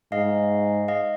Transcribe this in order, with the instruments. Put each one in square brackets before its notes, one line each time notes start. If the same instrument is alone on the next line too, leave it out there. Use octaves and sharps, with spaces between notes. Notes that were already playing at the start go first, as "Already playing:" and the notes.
[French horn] G#2 [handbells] D#5 F5
[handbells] D#5 F5